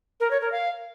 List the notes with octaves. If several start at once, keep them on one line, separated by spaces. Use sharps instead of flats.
A#4
C#5
A#4
F5